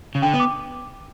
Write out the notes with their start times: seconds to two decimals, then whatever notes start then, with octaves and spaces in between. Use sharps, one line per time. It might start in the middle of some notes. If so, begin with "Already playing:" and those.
0.15 C#3
0.22 D3 G5
0.34 B3
0.40 D6